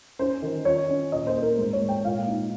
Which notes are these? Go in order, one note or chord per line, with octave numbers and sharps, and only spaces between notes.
C#4 C5
D#3
F4 C#5
C#4
A#2 D#5
C5
A#3
A#4
G#2 C5
C#5
G#2
G5
A#2 F5
D#4